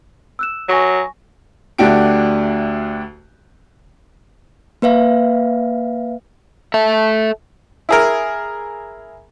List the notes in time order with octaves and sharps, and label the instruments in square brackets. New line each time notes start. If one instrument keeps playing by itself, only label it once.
[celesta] E6 F#6 E7
[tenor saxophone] F#3 [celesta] G#5 C#6 A#6
[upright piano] D2 A3 D4 F#4 G4 D7
[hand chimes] A#3 B4 E5 F5
[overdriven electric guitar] A4 E5
[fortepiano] E4 G#4 A#4